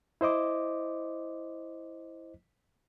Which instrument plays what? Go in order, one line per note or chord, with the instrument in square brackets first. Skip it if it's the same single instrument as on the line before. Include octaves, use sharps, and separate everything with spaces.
[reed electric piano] E4 C5 D#5 D6